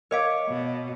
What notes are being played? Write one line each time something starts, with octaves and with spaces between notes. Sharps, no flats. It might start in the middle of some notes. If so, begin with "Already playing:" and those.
A#4 C#5 D#5 F5 D6
B2